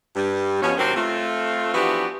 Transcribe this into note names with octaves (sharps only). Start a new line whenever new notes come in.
G2 G3
B2 F3 C#4
D#2 C3 F#3 C4
A3 C4 F4
E3 F3 B3 D4 F#4 G4